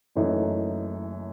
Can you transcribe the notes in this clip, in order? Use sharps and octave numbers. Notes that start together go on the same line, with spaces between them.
F#1 F#2 E3 A3 D#4